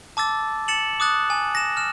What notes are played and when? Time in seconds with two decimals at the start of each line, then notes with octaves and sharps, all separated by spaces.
0.17 A5 D6 E6 A6
0.68 A6 C#7 E7 F#7
1.00 D6 D#6 F#6 A6
1.30 G#5
1.55 A#6 E7
1.77 F6 E7